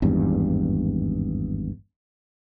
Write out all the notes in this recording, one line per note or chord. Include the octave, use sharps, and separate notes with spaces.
G#1 E2 G2